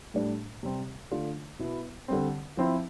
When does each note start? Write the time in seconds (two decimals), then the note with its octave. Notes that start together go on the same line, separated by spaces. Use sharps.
0.14 A2 G3 D4
0.63 C3 G3 C4
1.11 D3 A3 D4 F4
1.59 B2 B3 E4
2.08 D3 G3 C4
2.57 F3 C4 E4